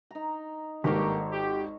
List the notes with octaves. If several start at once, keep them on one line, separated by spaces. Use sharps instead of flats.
D#4 A#5
G#1 G2 A#3 G4 A4 C#5 A#5
G4